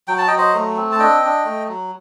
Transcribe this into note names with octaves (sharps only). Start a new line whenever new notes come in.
F#3 G5
A5
D#5 G5
F#3
C5 D#5
A3
C4
A5
D4 D#5 G5
D4
A3
F#3